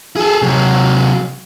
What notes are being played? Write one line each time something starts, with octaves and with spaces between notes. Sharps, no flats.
G#4 A4
C3 F#3